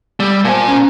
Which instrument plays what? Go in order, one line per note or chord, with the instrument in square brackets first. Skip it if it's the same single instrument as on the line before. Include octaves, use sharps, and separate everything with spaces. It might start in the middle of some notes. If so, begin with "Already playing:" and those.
[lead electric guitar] G3 [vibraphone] E6
[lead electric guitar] A#2 G#5 [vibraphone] C5 A5
[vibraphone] C#4 A#5